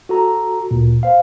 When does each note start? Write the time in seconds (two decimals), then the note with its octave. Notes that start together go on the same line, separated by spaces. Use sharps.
0.09 F#4 A4 A#5
0.71 D2 A#2
1.03 C5 F5